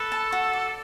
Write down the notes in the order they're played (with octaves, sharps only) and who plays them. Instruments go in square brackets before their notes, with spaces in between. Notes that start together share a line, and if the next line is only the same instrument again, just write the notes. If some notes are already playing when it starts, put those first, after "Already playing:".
Already playing: [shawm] A4 [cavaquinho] B4
[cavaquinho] A5
F#4
D5